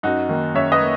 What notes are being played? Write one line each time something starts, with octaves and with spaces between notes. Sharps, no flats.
F#2 D#4 F#4
D#3 A#3
F#2 C#5 E5
B4 D#5
A#3